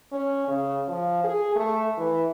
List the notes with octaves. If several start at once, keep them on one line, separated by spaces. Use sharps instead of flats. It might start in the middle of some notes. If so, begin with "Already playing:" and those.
C#4
C#3
F3
G#4
A3
E3